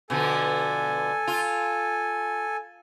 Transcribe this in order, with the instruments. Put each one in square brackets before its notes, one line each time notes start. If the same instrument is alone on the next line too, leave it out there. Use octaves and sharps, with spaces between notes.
[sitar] B2 D3 F3 [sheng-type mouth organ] A4 G#5
[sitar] F4